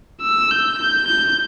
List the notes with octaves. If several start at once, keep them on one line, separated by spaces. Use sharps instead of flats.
E6
G6
G6
G6